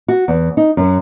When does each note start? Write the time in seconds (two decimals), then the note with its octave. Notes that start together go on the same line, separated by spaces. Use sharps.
0.08 F#4
0.28 E2
0.57 D#4
0.77 F#2